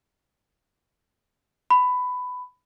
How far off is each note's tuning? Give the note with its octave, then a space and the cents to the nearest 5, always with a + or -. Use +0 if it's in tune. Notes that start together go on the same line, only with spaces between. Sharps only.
B5 +15